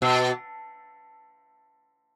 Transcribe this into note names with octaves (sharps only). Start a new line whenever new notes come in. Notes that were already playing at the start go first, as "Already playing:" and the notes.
B2